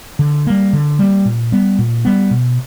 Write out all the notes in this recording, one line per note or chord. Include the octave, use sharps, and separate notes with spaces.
D3
G3 A#3
D3
G3 A#3
A#2
G3 B3
A#2
G3 B3
B2